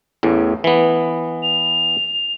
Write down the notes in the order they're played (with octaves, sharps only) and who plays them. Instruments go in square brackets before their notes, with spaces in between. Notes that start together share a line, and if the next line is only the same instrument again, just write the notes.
[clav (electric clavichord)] A1 E2 A2
E3 B3
[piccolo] F7